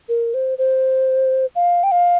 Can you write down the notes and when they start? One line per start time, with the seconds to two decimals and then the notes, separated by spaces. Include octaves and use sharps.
0.09 A#4
0.34 C5
0.58 C5
1.55 F5
1.83 G5
1.92 F5